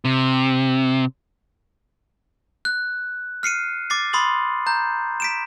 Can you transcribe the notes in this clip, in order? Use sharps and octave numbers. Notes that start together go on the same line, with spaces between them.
C3
F#6
F6 C7 C#7 D#7
D6 A6 C7
B5 C6 D#6 A6 F#7
A#5 G6
B6 D7 E7